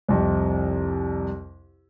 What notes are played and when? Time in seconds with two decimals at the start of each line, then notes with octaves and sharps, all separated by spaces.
0.09 C2 F2 C3